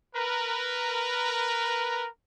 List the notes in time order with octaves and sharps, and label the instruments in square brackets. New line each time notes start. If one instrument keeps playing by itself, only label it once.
[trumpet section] A#4 B4